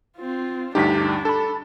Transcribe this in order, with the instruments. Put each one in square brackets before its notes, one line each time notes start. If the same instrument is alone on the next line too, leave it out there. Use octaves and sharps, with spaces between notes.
[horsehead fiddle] C4 F4
[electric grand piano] D2 G2 G4 [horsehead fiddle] D4 [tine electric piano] D#4 B6
[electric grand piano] A4 [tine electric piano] A5 B5